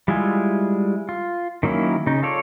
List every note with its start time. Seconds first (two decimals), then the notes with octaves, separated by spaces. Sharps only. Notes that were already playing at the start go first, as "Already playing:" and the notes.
0.08 G3 G#3 E4 F4 G#5
1.09 F4
1.63 D#3 F#3 A#3 C#4 E4
2.06 C#3 D#4
2.23 F4 A4 C#5 D5